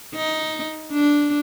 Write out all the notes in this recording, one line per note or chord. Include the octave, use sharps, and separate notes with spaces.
D#4
D4